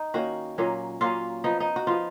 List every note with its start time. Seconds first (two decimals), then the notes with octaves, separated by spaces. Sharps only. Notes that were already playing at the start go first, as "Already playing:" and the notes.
Already playing: D#4
0.14 D#3 A#3 C#4 F#4
0.58 A#2 F#3 A#3 C#4
1.01 A#2 F#3 A#3 C#4 F4
1.44 F3 B3 D#4
1.60 D#4
1.76 F#4
1.87 F3 B3 F4